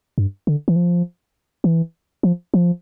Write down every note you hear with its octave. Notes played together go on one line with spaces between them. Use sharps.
G2
D3
E3
F3
E3
F3
F3